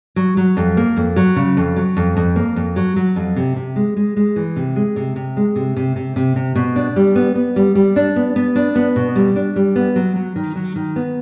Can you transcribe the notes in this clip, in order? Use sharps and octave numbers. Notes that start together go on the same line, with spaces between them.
F#3
F#3
F2
A#3
F2
F#3
C#3
F2
F#3
F2
F2
A#3
F2
F#3
F#3
F2
C3
C3
G#3
G#3
G#3
E3
C3
G#3
C3
C3
G#3
C3
C3
C3
C3
C3
B2
D4
G3
B3
B3
G3
G3
D4
B3
B3
D4
B3
B2
G3
D4
G3
B3
F#3
F#3
D#3
F#3
D#3
B3